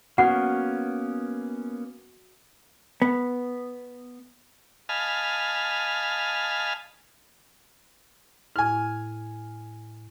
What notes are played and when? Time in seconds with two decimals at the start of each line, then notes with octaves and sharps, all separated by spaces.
0.18 A#3 B3 C#4 F#4 F#5
3.02 B3
4.89 D#5 F5 G#5 A5 B5 F6
8.56 A2 E4 G#5 F6